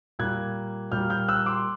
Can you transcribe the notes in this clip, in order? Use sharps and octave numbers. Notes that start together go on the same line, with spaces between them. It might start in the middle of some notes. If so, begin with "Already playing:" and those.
A#2 G3 A#3 F#6 G#6
A#2 G3 A#3 F6 G6
F6 G6
E6 F#6
C6 D6